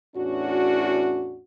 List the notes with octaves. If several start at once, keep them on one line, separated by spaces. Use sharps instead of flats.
E2 A2 C#4 D4 F#4